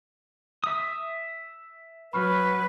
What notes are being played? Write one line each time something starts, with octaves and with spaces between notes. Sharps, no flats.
E5 D#6
F#3 B4 B5 C#6 F6